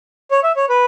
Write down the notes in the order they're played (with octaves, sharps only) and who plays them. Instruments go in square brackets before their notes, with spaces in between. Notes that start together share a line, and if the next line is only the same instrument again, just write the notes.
[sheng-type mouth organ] C#5
E5
C#5
B4